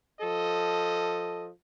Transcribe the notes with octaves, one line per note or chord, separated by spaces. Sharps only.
F3 A4 D#5